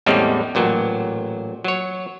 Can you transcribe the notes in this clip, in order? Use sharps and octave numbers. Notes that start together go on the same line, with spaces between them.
E2 A2 G3 G#3 C4 C#4
A1 A#2 F#3
F#3 C#5